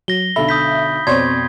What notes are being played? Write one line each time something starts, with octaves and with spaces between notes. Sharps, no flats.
F#3 A#6 G7
B1 D3 A4 E5 B5
D#6 G6 B6
F2 B2 C4 C#5 D5 C6 G#6